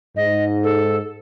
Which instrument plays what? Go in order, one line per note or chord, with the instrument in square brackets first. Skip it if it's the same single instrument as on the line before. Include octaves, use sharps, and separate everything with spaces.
[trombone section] G#2 [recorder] D#5
[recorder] A4